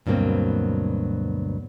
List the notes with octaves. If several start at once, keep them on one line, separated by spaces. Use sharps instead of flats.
D2 G2 B2 F#3 A#3 C4